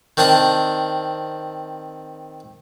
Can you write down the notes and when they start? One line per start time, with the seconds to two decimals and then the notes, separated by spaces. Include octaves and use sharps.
0.17 D#3 C4 D4 C#6 D#6